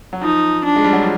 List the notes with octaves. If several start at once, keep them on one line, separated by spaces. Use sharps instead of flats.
F#3
F3 D#4
D4
G#3
G3
F#3
F3